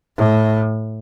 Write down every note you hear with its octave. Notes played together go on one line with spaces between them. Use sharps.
A2